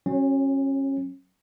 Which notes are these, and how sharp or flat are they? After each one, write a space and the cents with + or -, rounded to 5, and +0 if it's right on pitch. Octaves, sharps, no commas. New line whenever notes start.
F#3 +5 C#4 -30